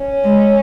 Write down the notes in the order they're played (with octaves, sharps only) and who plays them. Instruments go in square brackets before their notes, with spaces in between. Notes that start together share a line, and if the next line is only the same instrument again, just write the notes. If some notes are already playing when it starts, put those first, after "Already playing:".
Already playing: [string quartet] C#4
[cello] G#3